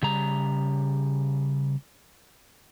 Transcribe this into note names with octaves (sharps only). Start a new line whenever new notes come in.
C#3 G3 A#5